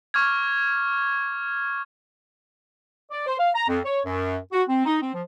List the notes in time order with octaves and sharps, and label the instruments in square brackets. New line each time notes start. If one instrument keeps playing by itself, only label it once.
[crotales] C#6 D6 F6 G#6
[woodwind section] D5
C5
F5
A#5
F2
C#5
F#2
F#4
C4
D#4
C4
F3